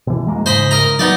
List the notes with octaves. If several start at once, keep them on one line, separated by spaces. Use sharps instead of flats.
B2 E3
F2 G#3 A#3
G#2 C#3 C5 D#5 B5
A#4 D#5 A#5
F#3 B3 D#4 D5